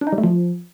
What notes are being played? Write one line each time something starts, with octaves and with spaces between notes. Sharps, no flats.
D4
D#4
G3
A3
F3